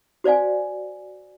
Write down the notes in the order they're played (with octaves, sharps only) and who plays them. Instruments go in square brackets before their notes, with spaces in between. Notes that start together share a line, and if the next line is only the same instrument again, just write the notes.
[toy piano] F#4 C5 D5 F5 G#5